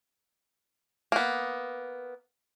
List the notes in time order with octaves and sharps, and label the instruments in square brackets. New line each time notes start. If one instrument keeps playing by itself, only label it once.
[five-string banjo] A#3 B3